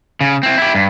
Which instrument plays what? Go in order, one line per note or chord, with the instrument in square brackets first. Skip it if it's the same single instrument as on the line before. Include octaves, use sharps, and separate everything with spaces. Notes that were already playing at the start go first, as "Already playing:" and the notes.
[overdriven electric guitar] C#3
C4 E4
E4 G4
G2